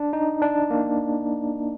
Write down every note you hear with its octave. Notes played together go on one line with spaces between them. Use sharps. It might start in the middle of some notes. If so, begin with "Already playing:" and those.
Already playing: D4
D#4
D4
A#3